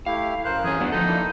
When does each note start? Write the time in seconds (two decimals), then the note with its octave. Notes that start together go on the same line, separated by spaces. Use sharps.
0.06 A3 E4 G4 F5
0.45 F#2 A#4 C5 F#6
0.64 E2 C#4 G#4
0.81 D2 F#3 B3 D4 F#5
0.92 F3 D#4 A4
1.06 A#3 D4 E4